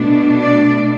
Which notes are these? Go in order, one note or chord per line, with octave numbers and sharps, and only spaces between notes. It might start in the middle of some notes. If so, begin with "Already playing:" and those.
Already playing: B2 A3 D4
D5